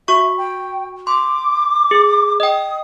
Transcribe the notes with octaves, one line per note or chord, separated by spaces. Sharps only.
F#4 E5 C#6
G5
C6 D6
G#4
D#5 G5 D#6